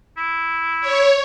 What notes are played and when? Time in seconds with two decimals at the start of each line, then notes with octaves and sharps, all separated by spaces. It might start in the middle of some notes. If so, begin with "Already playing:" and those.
0.17 E4
0.81 C#5